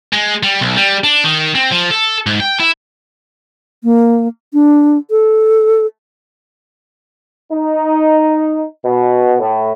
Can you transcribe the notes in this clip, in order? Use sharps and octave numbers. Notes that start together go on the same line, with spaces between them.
G#3
G3
B1
G3
D4
D#3
C4
F3
A4
G#2
G5
E4
A#3
D4
A4
D#4
B2
A2